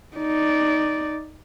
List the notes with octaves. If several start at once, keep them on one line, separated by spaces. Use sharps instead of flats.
D#4 D5